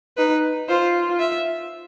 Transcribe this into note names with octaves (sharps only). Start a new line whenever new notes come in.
D#4 B4
F4 C5
E5